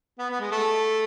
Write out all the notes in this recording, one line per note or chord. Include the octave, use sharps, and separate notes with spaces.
B3
B3
G#3
A3